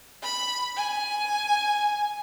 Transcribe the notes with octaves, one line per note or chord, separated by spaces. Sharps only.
B5
G#5